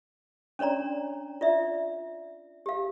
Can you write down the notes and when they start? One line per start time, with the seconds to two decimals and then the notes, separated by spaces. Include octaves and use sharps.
0.59 C#4 D4 C#5 D5 A#5
1.41 F4 D5 E5
2.66 G4 F5